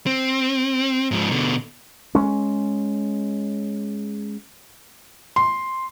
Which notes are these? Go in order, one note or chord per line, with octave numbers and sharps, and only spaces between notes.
C4
G#2 F3
B2 D3
G#3 C#4
C6